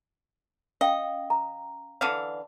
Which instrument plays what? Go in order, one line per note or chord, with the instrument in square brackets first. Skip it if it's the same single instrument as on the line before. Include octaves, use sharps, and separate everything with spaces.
[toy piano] C#4 F5 G5 [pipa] D#5
[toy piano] A#5
[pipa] D3 E3 F5